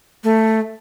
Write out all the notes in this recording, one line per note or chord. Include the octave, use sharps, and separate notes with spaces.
A3